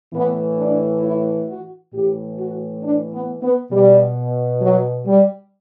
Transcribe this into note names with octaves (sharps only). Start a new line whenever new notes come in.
A2 E3 B3
D4
E4
F#4
A2 E3 G4
F#4
D4
B3
B3
B2 G3
F#3
G3